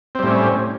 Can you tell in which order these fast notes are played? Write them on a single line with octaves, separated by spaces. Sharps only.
C4 G3 A2 C#4